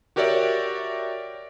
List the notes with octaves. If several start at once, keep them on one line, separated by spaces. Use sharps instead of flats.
F#4 G4 A#4 C#5 D5 E5